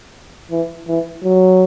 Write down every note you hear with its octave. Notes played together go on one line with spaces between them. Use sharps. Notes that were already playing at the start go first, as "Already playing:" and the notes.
E3
E3
F#3